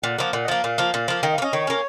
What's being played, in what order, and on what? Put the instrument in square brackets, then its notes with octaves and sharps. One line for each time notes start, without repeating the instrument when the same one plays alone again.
[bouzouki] A#2 [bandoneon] F#5
[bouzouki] F3 A#3
[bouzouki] A#2 [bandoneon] F#5
[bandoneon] D#5
[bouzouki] F3 A#3 [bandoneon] F5
[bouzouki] A#2
F3 A#3
A#2
F3 A#3
[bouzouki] D#3 [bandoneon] D#5
[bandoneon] F5
[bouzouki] A#3
[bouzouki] C#4 [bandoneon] D#5
[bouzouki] D#3 [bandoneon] C#5
[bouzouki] A#3 C#4